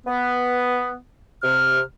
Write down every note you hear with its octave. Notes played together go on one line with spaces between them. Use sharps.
B3
C3 F6